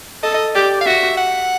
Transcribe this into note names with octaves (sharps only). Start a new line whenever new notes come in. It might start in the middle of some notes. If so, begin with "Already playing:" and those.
A4 D#5
D#5
G4 D5
F5
F#4 E5
F#5